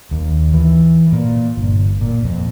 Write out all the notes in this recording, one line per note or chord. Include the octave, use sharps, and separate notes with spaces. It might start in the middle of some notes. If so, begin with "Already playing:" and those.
D#2
E3
A#2
G1
A#2
F2